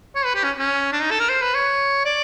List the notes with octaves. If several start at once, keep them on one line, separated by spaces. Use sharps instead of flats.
C#5
B4
G4
C#4
C#4
D4
D#4
A4
A#4
C5
B4
C#5
D5